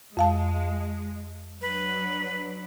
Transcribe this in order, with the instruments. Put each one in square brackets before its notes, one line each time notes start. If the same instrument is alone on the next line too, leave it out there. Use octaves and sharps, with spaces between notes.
[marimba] F2 F5 A5 [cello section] G#3
[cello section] F#3 D4 [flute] B4